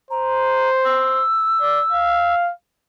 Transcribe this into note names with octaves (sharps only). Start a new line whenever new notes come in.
C5 A#5
E6
D5
F5